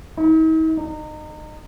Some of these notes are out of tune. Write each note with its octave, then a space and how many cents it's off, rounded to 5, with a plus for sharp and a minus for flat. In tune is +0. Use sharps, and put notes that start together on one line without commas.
D#4 +45
D#4 -30